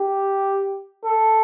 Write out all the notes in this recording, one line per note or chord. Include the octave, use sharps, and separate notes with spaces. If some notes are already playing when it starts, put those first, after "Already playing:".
Already playing: G4
A4